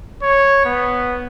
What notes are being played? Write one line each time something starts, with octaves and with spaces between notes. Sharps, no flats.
C#5
B3